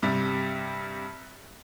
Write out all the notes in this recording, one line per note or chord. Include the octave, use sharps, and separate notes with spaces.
G2 C3 G3